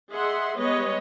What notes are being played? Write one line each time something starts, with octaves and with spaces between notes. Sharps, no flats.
G#4 D#5 E5 F#5 C6
G3 G#3 B3 B4 C#5 D#5